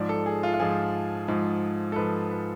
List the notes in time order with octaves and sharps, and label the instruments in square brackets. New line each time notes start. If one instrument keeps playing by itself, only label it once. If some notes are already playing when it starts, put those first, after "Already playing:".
Already playing: [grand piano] G#2 F3 D5
A4
G#4
F4
F4
G#2 F3 G#4
G#2 F3
A4
G#2 F3 B4
B4